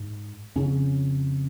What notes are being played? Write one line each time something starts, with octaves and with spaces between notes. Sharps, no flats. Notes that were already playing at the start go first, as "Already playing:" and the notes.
Already playing: G#2
F2 C#3 C#4